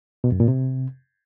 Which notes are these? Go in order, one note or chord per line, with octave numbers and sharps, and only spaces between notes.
B2
F#2
A#2
C3